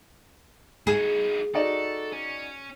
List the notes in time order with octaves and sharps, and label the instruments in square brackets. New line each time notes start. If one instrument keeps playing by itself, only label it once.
[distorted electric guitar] D#4 F#4 [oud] G#4
[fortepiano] D#4 F#4 D5 [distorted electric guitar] A4
[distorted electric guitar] C#4